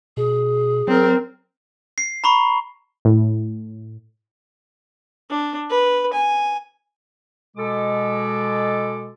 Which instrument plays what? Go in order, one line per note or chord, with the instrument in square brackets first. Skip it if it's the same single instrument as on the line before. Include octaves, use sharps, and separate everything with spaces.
[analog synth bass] B2 [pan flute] G#4
[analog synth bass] F#3 [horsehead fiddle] C4 A#4
[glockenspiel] C7
A#5 B5 C#6
[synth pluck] A2
[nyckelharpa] D4
B4
G#5
[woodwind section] B2 G#3 A4 D6